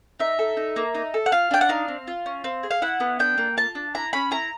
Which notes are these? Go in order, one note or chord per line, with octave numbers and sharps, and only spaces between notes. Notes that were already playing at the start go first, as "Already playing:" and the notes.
D#4 E5
A4
D#4
A#3
D#4
A4
F#5
F4 F5
D4 G5
F#5
D#4 F5
C4
F4
C#4
C4
G#4
F5
E4 F#5
B3
D4 G5
A#3
F4 A5
D4
E4 A#5
C#4 B5
E4 A#5